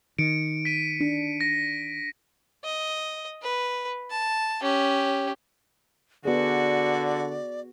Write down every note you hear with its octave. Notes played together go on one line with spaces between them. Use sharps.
D#3 C#7 D7
B6 D#7
D4
A#6
D#5
B4
A5
C#4 G4
D3 B3 F#4 G#4 D5